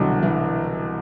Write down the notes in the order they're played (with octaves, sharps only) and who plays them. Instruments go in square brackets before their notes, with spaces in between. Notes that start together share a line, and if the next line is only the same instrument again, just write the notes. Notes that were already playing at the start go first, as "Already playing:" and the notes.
Already playing: [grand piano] C2 B2 F#3 [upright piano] D3 E3
[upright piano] E3